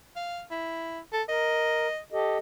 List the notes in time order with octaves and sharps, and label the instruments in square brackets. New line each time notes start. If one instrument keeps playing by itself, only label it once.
[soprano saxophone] F5
E4
A4
[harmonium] A#4 [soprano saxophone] D#5
[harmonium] G4 A4 D#5